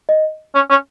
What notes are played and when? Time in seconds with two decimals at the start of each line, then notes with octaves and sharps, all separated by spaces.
0.09 D#5
0.55 C#4
0.70 C#4